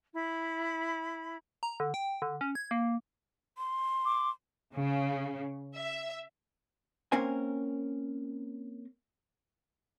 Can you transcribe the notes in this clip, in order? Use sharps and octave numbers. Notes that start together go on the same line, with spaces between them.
E4 B5
A#5
D3
G5
D3
C#4
G#6
A#3
C6
D6
C#3
E5
A#3 C4 C#4 A#4 C5 G#5